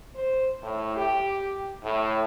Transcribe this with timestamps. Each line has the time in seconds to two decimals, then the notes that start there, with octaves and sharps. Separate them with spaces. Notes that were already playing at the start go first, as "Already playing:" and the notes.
0.15 C5
0.63 A2
0.96 G4
1.84 A2